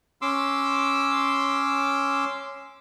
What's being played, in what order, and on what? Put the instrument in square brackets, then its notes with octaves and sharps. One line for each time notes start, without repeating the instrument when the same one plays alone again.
[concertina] C#4 C6 D6 E6